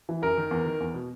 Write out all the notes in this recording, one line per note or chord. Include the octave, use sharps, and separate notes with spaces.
E3
F#2 A#4
D#3
E2
D#3
E2
B2